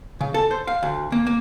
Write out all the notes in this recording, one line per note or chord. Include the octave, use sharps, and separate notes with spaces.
C#3
A4
C5
F5
D2
A#3
A#3